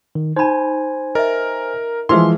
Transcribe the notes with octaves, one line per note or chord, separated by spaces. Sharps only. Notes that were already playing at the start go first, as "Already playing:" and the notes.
D#3
D#4 C5 G#5 B5
A#4 D#5 E5
E3 F3 G#3 A#4 C5 E5 C6